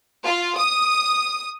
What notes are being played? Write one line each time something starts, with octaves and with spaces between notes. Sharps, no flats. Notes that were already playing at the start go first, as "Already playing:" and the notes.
F4
D#6